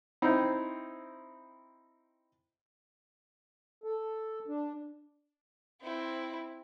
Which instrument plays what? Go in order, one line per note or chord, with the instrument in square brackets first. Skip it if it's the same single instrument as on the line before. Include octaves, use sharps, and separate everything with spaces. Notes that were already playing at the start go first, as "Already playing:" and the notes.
[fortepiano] C4 D#4 E4
[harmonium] A4
D4
[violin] C4 E4